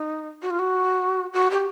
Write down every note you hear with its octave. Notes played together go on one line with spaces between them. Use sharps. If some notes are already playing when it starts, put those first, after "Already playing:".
Already playing: D#4
F#4
F4
F#4
F#4
G4